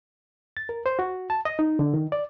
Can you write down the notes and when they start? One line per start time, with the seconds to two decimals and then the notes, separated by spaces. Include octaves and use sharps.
0.57 A6
0.69 A#4
0.86 C5
0.99 F#4
1.30 A5
1.45 D#5
1.59 D#4
1.79 D3
1.94 D#3
2.12 D5